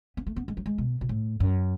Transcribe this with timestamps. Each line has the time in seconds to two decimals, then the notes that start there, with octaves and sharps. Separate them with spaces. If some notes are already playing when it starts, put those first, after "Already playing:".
0.17 B3
0.27 A3
0.36 B3
0.48 G#3
0.57 F#3
0.66 G#3
0.78 B2
1.01 B2
1.09 A2
1.40 F#2